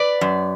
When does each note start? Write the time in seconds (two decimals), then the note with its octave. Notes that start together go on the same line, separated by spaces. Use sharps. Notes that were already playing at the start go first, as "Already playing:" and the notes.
Already playing: B4 D5
0.21 F#2